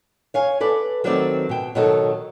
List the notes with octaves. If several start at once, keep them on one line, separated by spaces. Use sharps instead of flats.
C#5 F5 G#5
A4 B4 D5
D#3 F#3 A3 B3 C4 D5
B2 G5
B2 D#3 F#3 D#4 F#4 A4